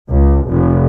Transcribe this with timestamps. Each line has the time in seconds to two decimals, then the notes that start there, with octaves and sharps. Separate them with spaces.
0.11 C#2
0.48 F1